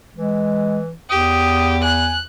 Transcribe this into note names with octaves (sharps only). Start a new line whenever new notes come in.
E3 G#3
E2 G4 D#6
G#5 F#6